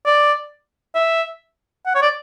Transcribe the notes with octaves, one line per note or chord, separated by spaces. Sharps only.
D5
E5
F#5
C#5
D5